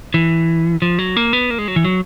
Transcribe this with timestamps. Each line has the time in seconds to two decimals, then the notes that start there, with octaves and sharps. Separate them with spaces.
0.14 E3
0.82 F3
0.99 F#3
1.16 A#3
1.33 B3
1.50 A#3
1.58 G#3
1.68 F#3
1.76 E3
1.85 F#3